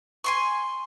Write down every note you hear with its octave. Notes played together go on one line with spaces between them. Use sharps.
G#5 C6 C#6